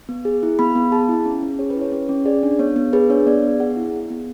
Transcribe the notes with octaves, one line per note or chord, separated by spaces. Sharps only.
B3
G#4
E4
B3 B5
B3
G#4 A5
E4
C#4
C#4
G#4 C#5
B4
E4
C#5
C#4 C#5
C#4
G#4 D5
D4
B3 C#5
B3
G#4 B4
D4 C#5
B3 D5
B3
G#4 F#5
E4
B3
B3